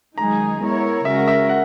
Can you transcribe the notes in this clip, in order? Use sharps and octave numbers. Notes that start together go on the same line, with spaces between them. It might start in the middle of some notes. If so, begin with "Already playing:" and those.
F#2 D#3 G#3 D#4 G#4 A#5
G#3 B3 E4 A#4 C#5
C#3 G#3 C#4 F#4 A#4 E5
E5
F#5